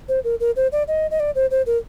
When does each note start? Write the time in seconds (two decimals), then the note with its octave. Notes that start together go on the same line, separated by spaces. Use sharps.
0.08 C5
0.24 A#4
0.40 A#4
0.56 C5
0.72 D5
0.88 D#5
1.11 D#5
1.20 D5
1.35 C5
1.51 C5
1.66 A#4